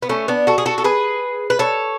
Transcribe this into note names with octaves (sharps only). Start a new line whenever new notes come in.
B3
A3 C#4
B3 D4
F#4 A4
G#4
F#4 A4
A4
G#4 B4
B4
A4 C#5